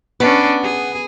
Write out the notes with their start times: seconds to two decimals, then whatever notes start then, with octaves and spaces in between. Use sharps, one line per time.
0.20 B3 C#4 D4
0.63 G#4